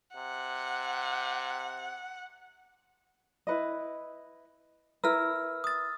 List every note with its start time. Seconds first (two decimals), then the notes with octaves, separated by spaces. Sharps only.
0.16 C3 F#5
3.47 E4 B4 D#5
5.04 E4 A#4 B4 E6 F6
5.64 D#6 A6